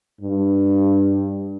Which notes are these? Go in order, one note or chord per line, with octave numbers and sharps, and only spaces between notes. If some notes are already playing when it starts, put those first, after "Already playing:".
G2